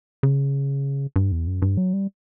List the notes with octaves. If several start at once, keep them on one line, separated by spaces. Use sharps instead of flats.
C#3
G2
E2
F#2
G2
F#3
G3